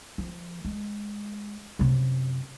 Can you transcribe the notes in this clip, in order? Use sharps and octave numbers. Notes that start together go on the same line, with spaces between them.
F3
G#3
F#2 C3